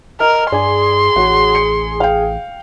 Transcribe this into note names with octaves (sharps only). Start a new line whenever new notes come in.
A#4 D#5 F6
G2 G#4 D5 G#5 C6
A1 F#4 C#5
C#7
F5 G5